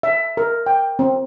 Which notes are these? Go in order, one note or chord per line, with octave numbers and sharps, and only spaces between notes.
E5
A#4
G5
C4